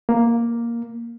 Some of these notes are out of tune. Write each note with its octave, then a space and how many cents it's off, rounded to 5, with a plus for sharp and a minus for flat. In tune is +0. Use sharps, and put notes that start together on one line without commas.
A#3 +5